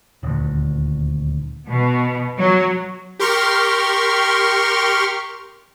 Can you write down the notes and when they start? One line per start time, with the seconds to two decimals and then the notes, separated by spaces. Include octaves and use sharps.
0.23 D#1 D2
1.68 B2
2.38 F#3
3.19 G4 A#4 C6 C#6 F6